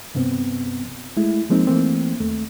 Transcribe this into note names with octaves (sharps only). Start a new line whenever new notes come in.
G2 C3 B3 C4
G#3 A3 E4
F3 G#3 A#3 C4 D#4
E3 A3 A#3 C4
D#2 A3